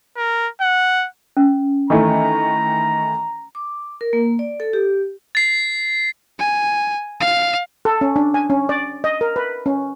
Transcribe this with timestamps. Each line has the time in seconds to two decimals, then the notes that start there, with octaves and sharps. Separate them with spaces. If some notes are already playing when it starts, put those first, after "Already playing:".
0.17 A#4
0.61 F#5
1.37 C#4
1.90 D#3 E3 A3 A#5
3.55 D6
4.01 A#4
4.13 A#3
4.39 D5
4.60 A4
4.73 G4
5.35 A6 C7
6.39 G#5
7.20 F5
7.85 A4
8.01 C#4
8.16 D4
8.34 G#5
8.50 C#4
8.69 D5
9.04 D#5
9.21 A#4
9.36 B4
9.66 C#4